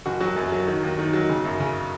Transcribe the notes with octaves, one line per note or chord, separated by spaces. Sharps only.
F#1 F#4
F#3 F#4
F#2
F#3
D#3
D#2
D#3 D#4
F#3
C#3
F#2
C#3